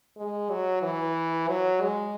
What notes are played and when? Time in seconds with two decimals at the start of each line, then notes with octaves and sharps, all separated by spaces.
0.17 G#3
0.50 F#3
0.82 E3
1.48 F#3
1.81 G#3